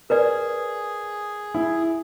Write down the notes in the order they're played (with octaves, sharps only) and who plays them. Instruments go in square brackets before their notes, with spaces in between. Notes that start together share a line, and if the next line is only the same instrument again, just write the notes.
[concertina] G#4 [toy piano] A#4 B4 D5
[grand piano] E4